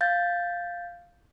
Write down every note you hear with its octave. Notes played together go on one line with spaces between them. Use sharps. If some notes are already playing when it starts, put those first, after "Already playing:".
F5 G6 A6